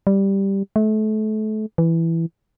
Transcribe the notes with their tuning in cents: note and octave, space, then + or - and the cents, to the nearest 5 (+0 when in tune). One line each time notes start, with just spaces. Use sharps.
G3 +0
A3 -30
E3 +5